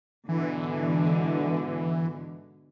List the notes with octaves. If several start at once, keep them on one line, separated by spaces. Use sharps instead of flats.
G#2 B2 D3 E3